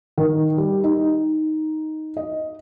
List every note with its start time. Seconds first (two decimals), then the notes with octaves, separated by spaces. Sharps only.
0.18 D#3
0.58 G3
0.84 D#4
2.17 D#5